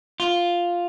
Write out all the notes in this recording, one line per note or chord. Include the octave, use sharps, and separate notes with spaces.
F4